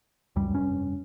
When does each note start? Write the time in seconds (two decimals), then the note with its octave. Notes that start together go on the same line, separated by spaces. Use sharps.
0.36 C#2 F#2 G3
0.54 F1 G2 C#4